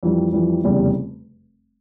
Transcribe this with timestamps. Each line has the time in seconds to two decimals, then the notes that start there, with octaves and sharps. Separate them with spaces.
0.03 F2 E3 G3
0.33 F2 E3 G3
0.64 F1 E2 C#3 G3